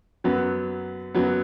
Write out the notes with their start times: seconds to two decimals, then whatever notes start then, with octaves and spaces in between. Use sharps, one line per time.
0.24 F#2 F#3 B3
1.15 F#2 F#3 B3